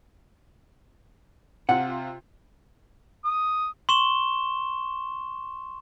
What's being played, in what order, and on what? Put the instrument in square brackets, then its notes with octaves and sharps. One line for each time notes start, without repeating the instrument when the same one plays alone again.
[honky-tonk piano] C3 F4 [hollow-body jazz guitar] F#5
[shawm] D#6
[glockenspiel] C6 C#6 E7 G7